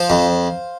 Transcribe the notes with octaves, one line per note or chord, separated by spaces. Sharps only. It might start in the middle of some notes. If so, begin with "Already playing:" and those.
Already playing: F3 C5 F5
F2